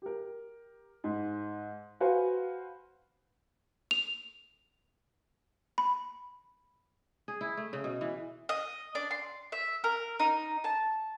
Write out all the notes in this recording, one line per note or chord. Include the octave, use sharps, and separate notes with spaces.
G4 A#4
G#2
F#4 B4 C5 F5 G#5
F7
B5
G#4
E4
A3
C#3
B2
E3
D#5
D4
C6
E5
A#4
D#4
A5